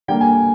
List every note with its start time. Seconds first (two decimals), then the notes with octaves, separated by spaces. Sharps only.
0.08 D3 G3 A#3 G5
0.21 G#5